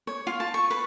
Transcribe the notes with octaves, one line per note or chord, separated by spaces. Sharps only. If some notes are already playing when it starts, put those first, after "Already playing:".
C#5
F4
A5
C#6
B4